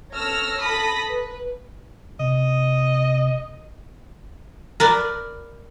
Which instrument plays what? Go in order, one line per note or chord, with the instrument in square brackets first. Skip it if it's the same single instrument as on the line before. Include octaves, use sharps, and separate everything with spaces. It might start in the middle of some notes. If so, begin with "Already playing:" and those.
[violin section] A4 C#5 E6 F6 A#6
A4 B5 D#6 A#6
B4
[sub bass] C3 [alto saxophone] D#5
[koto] A#4 B4 D5